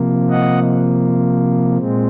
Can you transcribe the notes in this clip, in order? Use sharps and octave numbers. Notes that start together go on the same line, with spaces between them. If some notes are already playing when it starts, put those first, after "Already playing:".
Already playing: C3 F3 A#3
D#5 F#5
A#2 G#3 C4